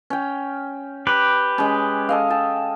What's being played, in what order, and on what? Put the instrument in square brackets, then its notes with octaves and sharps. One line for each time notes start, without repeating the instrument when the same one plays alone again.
[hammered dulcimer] C#4 G5
[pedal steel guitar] G4 B4
[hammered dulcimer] G#3 C#4
A4 D#5 F5
G5 A5